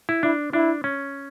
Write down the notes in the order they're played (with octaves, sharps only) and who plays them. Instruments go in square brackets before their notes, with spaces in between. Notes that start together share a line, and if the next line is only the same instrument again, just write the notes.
[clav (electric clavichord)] E4
[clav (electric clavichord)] D4 [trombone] E4
[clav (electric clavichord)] D4 [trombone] E4
[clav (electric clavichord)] C#4